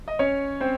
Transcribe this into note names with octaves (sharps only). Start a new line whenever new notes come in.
D#5
C#4 C#5
C4 C5